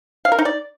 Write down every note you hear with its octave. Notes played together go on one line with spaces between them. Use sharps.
F5
A#4
D#4
D5